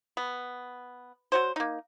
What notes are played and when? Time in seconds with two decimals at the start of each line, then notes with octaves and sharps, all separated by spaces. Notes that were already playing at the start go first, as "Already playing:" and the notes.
0.17 B3
1.32 F#3 F#4 C5
1.56 A#3 D#4